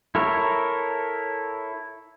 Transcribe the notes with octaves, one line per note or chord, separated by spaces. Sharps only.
E4 A4 A#4 C#5